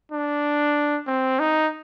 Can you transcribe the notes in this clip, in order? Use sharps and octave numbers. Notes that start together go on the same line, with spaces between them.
D4
C4
D#4